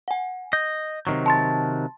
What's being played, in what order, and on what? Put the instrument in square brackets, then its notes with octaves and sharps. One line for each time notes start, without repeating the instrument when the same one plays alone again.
[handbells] F#5 G#5
[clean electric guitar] D#5 [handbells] G6
[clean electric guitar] C3 D#3 F#3
[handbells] A5 C6 A6